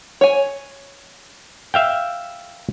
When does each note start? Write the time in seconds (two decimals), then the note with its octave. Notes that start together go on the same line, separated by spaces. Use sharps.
0.21 C#5 G#5
1.74 E5 F5 G5